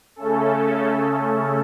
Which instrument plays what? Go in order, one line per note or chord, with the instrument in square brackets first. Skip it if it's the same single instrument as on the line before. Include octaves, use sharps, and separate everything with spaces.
[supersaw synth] C#3 A3 C#4 A4